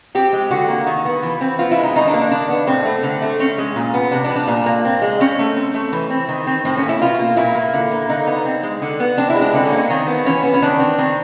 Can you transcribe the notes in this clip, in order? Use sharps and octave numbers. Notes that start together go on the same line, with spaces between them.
C4 G4
G#3
D3 F#4
A#3
D#3
B3
E3
C4
B3 F4
E4
G#3
D#4
D#3 D#4
D4
A#3
D4
D#3 D4
B3
A2 C4
A3
D3
A3
C4 C#4
G#3
A#2
B3
C3 D4
D4
G3
D4
A#2
A#3
C4
G#3
C4 C#4
A3
C4
A3
E3
C4
D#3
C4
A2 C4
C#4
A#3
E4
B2 F4
A#3
A#2 E4
A#3
D3
A#3
D3 D#4
B3
C4
G#3
D3
B3
C4 D4
E4
G#3
D4
D3 C4
C#4
A#3
C#4
D#3 C4
B3
E3 C#4
B3
C#4
D#3 D4
C4
D#3 C4